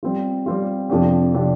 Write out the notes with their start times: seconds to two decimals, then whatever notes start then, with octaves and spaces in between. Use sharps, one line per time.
0.03 G3 C4 F4
0.46 G3 C4 F4
0.90 F2 C3 F3 D4 G4
1.34 C3 F3 D4 G4